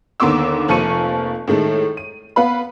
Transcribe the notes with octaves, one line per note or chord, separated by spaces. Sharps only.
D#2 D3 B3 C6 D6 E6
F1 F3 A#3 C#6 C#7 D#7
A2 D#3 G#3 A3
D#7
B3 B4 F5 B5